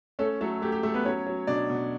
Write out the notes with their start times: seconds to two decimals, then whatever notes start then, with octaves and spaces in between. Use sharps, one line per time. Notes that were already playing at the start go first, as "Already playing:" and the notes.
0.19 A3 C#4 A4
0.41 F#3 A3 A4
0.62 A3 G4
0.72 G4
0.83 A3 A4
0.94 B3 B4
1.05 F#3 C#4 C#5
1.26 F#3
1.47 B2 D4 D5
1.70 B2